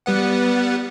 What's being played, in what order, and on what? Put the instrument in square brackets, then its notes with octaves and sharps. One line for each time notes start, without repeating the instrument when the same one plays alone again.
[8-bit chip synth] G3 B3 F#5